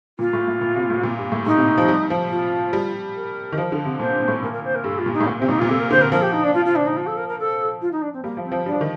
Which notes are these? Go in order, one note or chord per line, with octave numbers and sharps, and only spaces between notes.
A#2 F4
A2
A2
A#2
C3
A2
A#2
G2
A2
A2 D#4
C3
F3
G3
F3
F4
G3
A#4
D#3
F3
D3
C3
A#2 C5
A#2
A2
A#2 A#4
A#4
C5
A#4
G2 A4
F4
A#2
D#4
A2
A#2 A#3
C4
C3
A#2 D#4
F4
A#2
C3 A4
A#4
D3 C5
A#4
F3 A#4
G4
D#4
D4
F4
F4
D4
D#4
F4
A4
A#4
A#4
A4
F4
D#4
D4
C4
G3 A#3
F3
C4
F3
G3 D4
F3
D#3